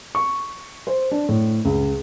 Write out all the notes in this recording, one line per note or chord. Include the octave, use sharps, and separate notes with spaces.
C#6
C5
D4
A2
C#2